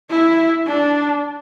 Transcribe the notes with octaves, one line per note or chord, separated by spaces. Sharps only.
E4
D4